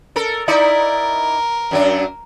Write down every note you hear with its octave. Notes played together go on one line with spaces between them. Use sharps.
A4 A#4
D#4 E4 A#4 D5
F#2 F#3 D4